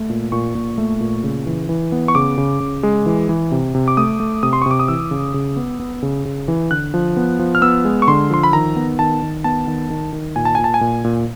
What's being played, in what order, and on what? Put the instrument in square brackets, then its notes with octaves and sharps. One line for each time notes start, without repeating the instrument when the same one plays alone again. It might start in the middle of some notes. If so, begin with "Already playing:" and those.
Already playing: [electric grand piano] A3
A#2
A#2 C#6
A#2
A3
A#2
C#3
E3
E3
B3
C#6
C#3 D6
C#3
C#3
G#3
E3
E3
C3
C3
D6
A3 D#6
A3
C3 D#6
C6
C#6
C3
D6
D#6
E3 E6
C#3
C#3
B3
B3
C#3
C#3
E3
D3 F#6
F3
B3
F3
F6
B3 E6
G#3
C#6
D3 C6
F3 C6
B5
D#3 A#5
B3
D#3 A5
D#3
B3 A5
D#3
D#3
D#3
A#2 G#5
A5
A#2 G#5
A5
G#5
A#2
A#2